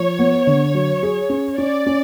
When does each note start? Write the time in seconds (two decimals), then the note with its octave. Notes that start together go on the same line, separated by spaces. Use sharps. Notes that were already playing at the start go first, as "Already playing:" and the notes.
Already playing: F3 C#5
0.19 B3
0.47 D3
0.74 F#3
1.03 G#4
1.30 C#4
1.58 C#4 D5
1.86 C#4